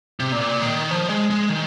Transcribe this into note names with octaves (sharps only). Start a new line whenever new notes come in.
C3
A#2
D#3
F3
G#3
G#3
D#3